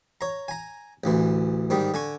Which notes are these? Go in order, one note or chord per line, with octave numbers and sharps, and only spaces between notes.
C#5 A#5
G#5 A#5
A1 D2 E3
G#2 D#3 G3
D3 G#5 C#6